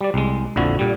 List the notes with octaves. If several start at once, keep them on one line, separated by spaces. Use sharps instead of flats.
G3 D5
C2 G#3
A#1 F2 D3 E4 F#4
A#2 G3